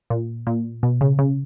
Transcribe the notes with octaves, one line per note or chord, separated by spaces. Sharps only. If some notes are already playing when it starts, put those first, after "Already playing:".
A#2
A#2
B2
C#3
C#3